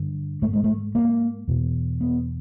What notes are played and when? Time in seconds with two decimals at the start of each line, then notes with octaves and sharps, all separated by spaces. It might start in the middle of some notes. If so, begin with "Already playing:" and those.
Already playing: G2 D3
0.42 G#2 A3
0.53 G#3
0.64 A3
0.95 A#3
1.48 E2 B2
2.01 B3